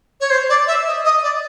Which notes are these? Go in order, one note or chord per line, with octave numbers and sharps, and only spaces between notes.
C#5
C5
D5
E5
D#5
D#5
D5